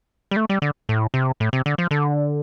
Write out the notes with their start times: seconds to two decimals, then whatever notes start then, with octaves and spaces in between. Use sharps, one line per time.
0.31 G3
0.36 A3
0.49 G3
0.62 D3
0.89 A2
1.14 C3
1.40 A2
1.53 C3
1.66 D3
1.78 F3
1.91 D3